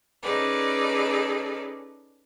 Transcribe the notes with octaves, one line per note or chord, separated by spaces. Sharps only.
C#4 D#4 G#4 A4 B4 D5